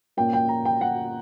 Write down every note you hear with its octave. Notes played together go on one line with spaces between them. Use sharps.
A#2 A#3 C#4 G5
G5
A#5
G5
F#5